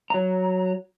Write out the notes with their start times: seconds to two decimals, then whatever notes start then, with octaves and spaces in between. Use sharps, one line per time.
0.10 F#3 A#5